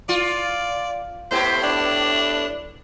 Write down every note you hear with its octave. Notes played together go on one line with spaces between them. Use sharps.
F4 D5
A2 B3 G4 C5
D4